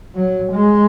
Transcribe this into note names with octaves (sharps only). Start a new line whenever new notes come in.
F#3
G#3